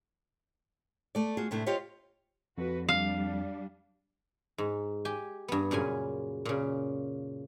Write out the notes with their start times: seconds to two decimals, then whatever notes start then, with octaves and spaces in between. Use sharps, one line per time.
1.15 A3 D5
1.37 F4 F#4 G#4
1.51 A2 C3 A3 D4
1.66 F4 G4 C5 C#5 D#5 F5
2.58 F2 F#4 B4
2.89 G3 D4 F5
4.58 G#2
5.05 G4 G#5
5.48 G2 B3
5.71 F#2 A#2 C#3 G#5
6.45 A#2 C#3